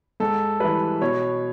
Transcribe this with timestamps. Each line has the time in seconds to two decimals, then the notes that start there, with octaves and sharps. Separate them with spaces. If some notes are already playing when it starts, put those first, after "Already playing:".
0.20 G#2 A4
0.60 E3 G3 B4
1.01 B2 C#5